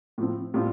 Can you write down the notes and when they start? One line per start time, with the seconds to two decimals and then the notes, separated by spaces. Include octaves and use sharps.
0.18 A2 F3 C4
0.54 A2 G3 C4 F4